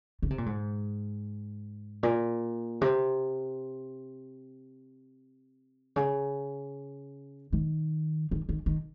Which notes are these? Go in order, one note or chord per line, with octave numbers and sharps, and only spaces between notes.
C#3
C3
A#2
G#2
A#2
C3
C#3
D#3
D#3
D#3
D#3